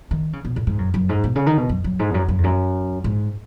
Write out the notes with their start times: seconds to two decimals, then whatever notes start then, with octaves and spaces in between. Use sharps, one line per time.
0.11 D#3
0.33 C#3
0.45 B2
0.56 A2
0.67 G#2
0.78 F#2
0.94 F#2
1.09 G#2
1.24 B2
1.35 C#3
1.46 D#3
1.57 B2
1.69 F#2
1.84 F#2
1.99 G#2
2.10 E2
2.14 F#2
2.28 F#2
2.38 E2
2.44 F#2
3.04 G#2